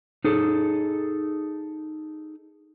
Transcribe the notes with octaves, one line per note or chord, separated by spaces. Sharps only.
D#4 G#4 A4